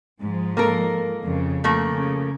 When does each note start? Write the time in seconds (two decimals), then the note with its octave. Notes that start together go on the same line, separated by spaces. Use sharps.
0.20 G#2 F3 G#3
0.57 A#3 A4 A#4
1.24 F2 C#3
1.64 F3 A3 A#3
1.95 C#3